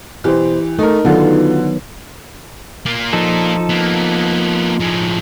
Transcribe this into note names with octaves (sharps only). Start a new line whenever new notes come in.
B2 E3 G4 C5
A3 D#4 A#4
D3 D#3 F#3 B3 D#4 F4 A4
A#3 F4
F3 D#4 A4
A#3 B3
A2 G#3